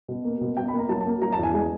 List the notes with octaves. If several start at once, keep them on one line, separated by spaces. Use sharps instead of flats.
B2
A#3
B2
B2 G5
B5
A#3
A#5
F#3 A5
A5
A#3
F#3 A#5
A5
E2
G#5
G#3 G#5